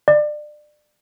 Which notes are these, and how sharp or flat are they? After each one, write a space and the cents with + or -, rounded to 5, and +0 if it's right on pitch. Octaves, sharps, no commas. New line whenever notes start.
D5 +30